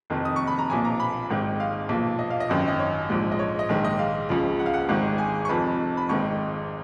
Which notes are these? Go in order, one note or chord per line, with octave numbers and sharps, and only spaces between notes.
F1 F2 D#3
D#6
C#6
B5
A#5
B1 A#2 F3 G#5
A#5
B5
G#1 G#2 D#3
F5
B1 A#2 F3
D#5
F5
D#5
G#1 F#2 D#3
D#5
C#5
A#1 G#2 F3
D#5
C#5
D#5
A#1 G#2 D#3
D#5
F5
C#2 C#3 F3
F#5
F5
F#5
G#1 G#2 D#3
G#5
C#6
F1 F2 F3 B5
B5
G#1 G#2 D#3 C#6